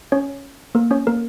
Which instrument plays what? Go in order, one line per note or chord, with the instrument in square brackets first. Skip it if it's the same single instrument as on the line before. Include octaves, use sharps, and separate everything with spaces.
[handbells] C#4 C#5
A#3 A#4
C#4 C#5
A#3 A#4